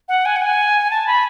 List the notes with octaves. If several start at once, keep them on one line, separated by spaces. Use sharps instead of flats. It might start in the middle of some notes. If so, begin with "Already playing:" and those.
F#5
G#5
F#5
G#5
A5
B5